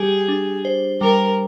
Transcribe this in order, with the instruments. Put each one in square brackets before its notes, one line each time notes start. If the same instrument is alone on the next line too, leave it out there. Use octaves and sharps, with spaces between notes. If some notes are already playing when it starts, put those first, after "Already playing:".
Already playing: [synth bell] G3 G4 [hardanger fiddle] G#4
[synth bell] D4
C5
[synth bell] G3 [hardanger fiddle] A#4